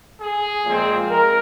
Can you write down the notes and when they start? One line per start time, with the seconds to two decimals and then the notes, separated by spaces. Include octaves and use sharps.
0.20 G#4
0.65 A#2 F3 G#3 C4
1.10 A#4